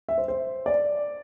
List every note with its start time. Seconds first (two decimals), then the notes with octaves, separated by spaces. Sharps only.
0.09 E5
0.18 C5
0.28 C5
0.66 D5